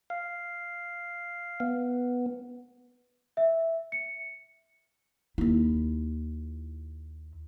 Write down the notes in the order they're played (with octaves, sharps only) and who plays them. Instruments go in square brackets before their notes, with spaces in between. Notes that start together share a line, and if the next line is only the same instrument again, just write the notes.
[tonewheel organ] F5
B3
[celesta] E5
C#7
[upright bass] D#2 E4